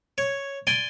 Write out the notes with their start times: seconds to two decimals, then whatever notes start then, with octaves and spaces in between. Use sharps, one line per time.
0.18 C#5
0.67 D5 G#5 C6